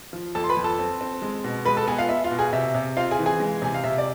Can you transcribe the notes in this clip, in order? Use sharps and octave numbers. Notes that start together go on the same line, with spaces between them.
F3
F2 A4 A5
C6
B4 B5
F2
A4 A5
C4
C4
G#3
B2
G#3 B4 B5
A4 A5
B3 G#4 G#5
F4 F5
B3 E5
F4 F5
B2
G#4 G#5
C3 E5
C3
C4 F4 F5
G#4 G#5
E3
G#4 G#5
G#3
C3 G#5
F5
C3 E5
D5